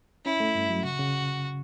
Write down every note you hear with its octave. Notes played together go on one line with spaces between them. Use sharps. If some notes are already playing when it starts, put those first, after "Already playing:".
C#4 E4
A3
G2
F#3
C#3 F#4
C#3